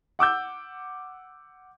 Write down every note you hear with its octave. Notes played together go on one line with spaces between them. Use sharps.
F#5 D6 E6 G6